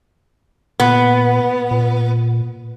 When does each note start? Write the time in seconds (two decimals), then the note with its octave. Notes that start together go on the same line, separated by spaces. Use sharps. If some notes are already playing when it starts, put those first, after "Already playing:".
0.80 A#2 B3
1.71 A#2